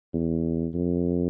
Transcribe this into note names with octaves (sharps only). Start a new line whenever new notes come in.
E2
F2